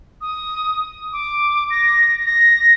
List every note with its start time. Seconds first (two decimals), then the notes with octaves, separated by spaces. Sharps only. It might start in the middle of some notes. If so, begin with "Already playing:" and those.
0.21 D#6
1.13 D6
1.70 A#6
2.26 A#6